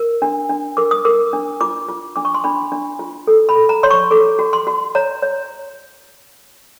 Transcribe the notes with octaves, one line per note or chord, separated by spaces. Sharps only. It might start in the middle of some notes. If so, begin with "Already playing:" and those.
Already playing: A#4
D4
D4
A#4 D6
D#6
A#4 D6
D4
F4 D6
F4
D4 D6
C#6
C6
D4 B5
D4
F4
A4
B5
A4
A#5
C#5 C6
C#6
A4 D6
F#4
C6
F#4
C#5 A#5
C#5